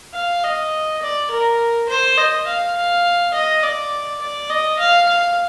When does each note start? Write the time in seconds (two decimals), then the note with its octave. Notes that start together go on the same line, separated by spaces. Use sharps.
0.14 F5
0.43 D#5
1.02 D5
1.31 A#4
1.89 C5
2.18 D#5
2.47 F5
2.76 F5
3.34 D#5
3.63 D5
4.21 D5
4.50 D#5
4.80 F5
5.08 F5